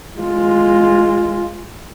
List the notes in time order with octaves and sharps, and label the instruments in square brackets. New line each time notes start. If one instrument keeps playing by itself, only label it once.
[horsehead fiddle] G#3 F4